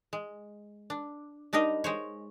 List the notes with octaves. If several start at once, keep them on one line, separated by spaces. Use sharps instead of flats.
G#3
D4
G3 D4 D#4 A#4 D#5
G#3 C5 C#5